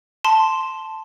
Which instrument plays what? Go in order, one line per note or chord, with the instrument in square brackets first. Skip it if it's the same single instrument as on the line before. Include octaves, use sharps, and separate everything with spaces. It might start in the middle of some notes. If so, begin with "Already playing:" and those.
[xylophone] A5 C6